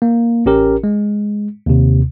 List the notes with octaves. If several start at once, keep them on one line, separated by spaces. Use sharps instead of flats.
A#3
A1 C#4 G4 A#4
G#3
D#2 C3